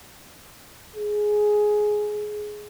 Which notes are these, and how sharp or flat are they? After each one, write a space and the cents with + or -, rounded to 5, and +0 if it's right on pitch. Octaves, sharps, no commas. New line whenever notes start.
G#4 +10